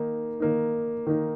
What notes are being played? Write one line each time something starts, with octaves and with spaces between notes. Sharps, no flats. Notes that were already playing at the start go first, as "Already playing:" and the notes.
Already playing: D#3 A#3 D#4
D#3 A#3 D#4
D#3 A#3 D#4